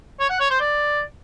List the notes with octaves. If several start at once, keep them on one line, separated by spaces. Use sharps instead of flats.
C#5
F#5
C#5
C5
D5